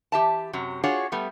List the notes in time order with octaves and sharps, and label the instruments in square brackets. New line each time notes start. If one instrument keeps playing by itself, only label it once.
[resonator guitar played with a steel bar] E3 G4 E5 A5
F#2 C3 F#3
D4 F4 F#4 G#4 C#5
G3 A3 B3